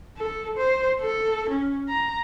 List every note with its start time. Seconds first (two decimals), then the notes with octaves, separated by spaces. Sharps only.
0.17 A4
0.58 C5
1.01 A4
1.50 C#4
1.89 A#5